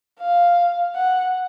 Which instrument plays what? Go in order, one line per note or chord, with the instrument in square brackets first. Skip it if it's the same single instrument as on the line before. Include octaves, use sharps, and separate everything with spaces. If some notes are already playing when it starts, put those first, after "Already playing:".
[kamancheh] F5
F#5